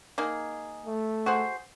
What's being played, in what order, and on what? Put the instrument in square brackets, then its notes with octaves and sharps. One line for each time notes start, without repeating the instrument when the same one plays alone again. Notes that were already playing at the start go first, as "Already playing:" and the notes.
[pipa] A#3 D#4 G#4
[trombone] A3
[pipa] F#4 G#4 C5